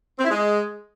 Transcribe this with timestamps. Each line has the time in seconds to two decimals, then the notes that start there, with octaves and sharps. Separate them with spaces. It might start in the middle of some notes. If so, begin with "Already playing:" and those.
0.19 C4
0.24 E4
0.30 G#3